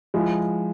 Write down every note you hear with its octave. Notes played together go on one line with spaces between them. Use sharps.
F3 G#3 E4